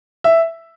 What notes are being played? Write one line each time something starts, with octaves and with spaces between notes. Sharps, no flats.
E5